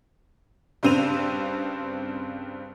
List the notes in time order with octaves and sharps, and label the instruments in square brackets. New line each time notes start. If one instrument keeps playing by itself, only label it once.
[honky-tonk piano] G2 C#3 C4 D#7 F7